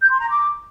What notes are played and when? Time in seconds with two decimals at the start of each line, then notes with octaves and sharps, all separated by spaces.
0.01 G6
0.10 C6
0.20 A#5
0.29 D6